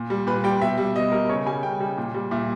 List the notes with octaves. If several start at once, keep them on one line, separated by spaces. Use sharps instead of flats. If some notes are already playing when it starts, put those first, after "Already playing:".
Already playing: A#2
G3
A#2 B4
G3 G5
B2 E5
G3
B2 D#5
G3 A#4
C#3 C#5
G3 G#5
C#3 G5
G3
A#2
G3
A#2 E5